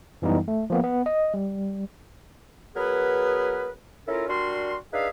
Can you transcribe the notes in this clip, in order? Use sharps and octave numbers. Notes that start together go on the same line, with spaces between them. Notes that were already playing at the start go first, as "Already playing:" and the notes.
F#2 E3 G3 B3 D#4
A3
F3 A#3 B3
B3
D#5
G3
F#3 B3 G#4 A#4 B4
C#4 E4 F4 A4 A#4
G3 D4 F#4 A#4 C6
D4 D#4 G#4 B4 E5 F5